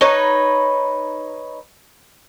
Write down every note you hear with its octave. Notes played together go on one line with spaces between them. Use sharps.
D#4 B4 C#5